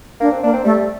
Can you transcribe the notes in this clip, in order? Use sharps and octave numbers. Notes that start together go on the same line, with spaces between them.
A#3 D4
C4
A#3 D4
C4
G3 A3